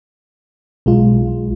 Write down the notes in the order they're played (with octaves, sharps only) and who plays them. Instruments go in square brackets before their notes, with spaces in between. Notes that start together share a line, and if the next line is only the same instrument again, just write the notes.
[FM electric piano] B1 G#3 F4